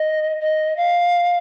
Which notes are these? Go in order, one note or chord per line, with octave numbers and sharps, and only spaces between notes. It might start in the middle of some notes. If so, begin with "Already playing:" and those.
Already playing: D#5
D#5
F5